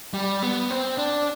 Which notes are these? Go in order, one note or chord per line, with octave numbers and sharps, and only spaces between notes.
G3
B3
C4
D4